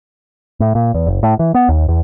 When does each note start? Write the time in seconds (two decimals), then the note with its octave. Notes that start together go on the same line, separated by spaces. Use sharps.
0.60 A2
0.75 A#2
0.94 E2
1.07 F#1
1.23 A2
1.39 E3
1.54 B3
1.69 D#2
1.88 E2